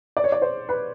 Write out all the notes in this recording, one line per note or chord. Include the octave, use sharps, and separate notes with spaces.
D5
C#5
D5
C5
B4